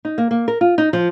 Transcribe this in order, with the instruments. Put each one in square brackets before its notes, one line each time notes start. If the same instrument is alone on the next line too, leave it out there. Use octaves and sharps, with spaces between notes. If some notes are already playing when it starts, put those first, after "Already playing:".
[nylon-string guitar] D#4
A#3
A#3
A#4
F4
D#4
F3